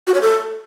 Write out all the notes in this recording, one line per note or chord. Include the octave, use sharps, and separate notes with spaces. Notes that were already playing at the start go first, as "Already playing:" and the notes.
F#4
C#5
A4